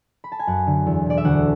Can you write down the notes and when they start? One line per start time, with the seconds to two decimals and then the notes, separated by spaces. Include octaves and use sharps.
0.24 B5
0.32 A5
0.40 G#5
0.47 F#2 F#5
0.67 D3
0.86 E2
1.06 B2 D5
1.17 E5
1.25 D2 F#5